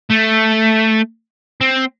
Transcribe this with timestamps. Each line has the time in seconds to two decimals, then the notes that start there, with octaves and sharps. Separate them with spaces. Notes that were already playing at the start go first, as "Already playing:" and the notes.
0.10 A3
1.61 C4